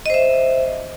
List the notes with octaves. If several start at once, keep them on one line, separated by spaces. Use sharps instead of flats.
C5 D#5 E5